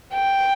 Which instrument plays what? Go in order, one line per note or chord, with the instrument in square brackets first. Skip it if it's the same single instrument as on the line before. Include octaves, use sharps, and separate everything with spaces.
[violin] G5